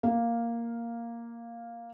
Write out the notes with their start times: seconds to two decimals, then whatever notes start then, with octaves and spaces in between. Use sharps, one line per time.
0.03 A#3 F5